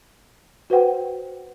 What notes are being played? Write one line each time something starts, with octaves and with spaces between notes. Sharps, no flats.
F#4 B4 C5 F#5 G5